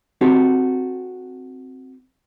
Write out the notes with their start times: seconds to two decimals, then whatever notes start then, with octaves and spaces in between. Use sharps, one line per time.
0.21 C4 D#4 F#4 G4 A4